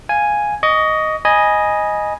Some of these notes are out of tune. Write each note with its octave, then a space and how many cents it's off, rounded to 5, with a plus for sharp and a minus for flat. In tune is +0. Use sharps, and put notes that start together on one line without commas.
F5 +0 G#5 +0
D#5 +0 C#6 +35
D#5 +0 G#5 +0 B5 -30